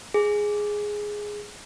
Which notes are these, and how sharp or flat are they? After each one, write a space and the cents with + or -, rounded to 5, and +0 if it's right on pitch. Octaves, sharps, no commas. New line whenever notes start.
G#4 +0